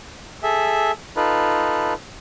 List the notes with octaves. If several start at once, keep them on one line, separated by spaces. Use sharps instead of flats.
G#4 A4 E5
D#4 F4 A4 B4